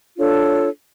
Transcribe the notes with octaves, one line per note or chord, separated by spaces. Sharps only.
D4 F4 A4 C#5